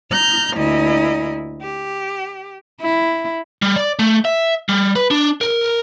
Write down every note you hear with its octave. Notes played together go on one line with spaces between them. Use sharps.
A#5 F6 G6
D2 A#2 E4 D#5
G4
E4
G3
D5
A3
E5
G3
B4
D4
A#4